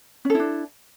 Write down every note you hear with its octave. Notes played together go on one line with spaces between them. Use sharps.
C#4 D4 E4 A4